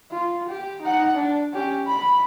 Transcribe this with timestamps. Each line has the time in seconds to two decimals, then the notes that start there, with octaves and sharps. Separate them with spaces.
0.11 F4
0.48 G4
0.82 D#4 F#5
1.15 D4
1.54 C#4 G4
1.87 B5